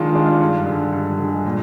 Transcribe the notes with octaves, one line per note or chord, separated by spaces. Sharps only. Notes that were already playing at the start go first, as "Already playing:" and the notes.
Already playing: D#3 G#3 D4 F4
G#3 D4 F4
G2
D3 G#3
G2
D3 G#3
A#2